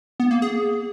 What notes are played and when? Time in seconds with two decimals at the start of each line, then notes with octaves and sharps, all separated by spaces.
0.20 B3
0.31 A#3
0.42 G#4